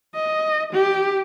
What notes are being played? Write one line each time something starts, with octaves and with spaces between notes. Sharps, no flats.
D#5
G4